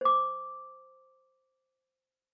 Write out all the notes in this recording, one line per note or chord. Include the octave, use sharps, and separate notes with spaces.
C5 D6